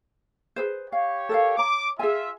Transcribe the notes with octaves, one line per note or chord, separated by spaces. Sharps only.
G#4 B4 C5
G4 C#5 F5
A4 A#4 F5
C#5 A#5 D6
F4 G#4 E5 G#5